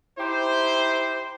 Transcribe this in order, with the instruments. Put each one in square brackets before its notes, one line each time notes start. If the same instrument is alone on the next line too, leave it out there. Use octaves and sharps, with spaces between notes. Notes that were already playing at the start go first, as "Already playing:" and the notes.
[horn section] D#4 E4 G4 C5